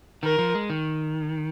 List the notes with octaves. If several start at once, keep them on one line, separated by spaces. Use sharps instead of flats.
D#3 A#4
F3
G#3
D#3